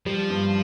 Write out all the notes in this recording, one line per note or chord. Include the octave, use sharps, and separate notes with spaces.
F3 G3
G2